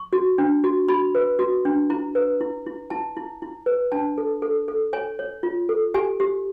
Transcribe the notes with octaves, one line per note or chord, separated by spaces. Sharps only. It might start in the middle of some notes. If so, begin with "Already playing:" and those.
Already playing: C#6
F#4
D4
F#4
F#4 B5
B4
F#4
D4
E4 A#5
B4
E4
E4
E4 A5
E4
E4
B4
D4 A5
A4
A4
A4
C#5 G#5
C#5
F4
A4
G4 G#5
G4